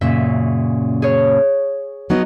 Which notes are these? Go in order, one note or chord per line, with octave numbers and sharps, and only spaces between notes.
F#2 A#2 C#3 E5
G#4 C#5
F#3 B3 D#4